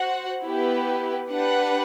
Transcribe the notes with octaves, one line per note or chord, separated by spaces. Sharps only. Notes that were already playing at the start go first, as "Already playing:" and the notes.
Already playing: F#4 C5 F#5
B3 E4 G4 B4
D4 G4 B4 F#5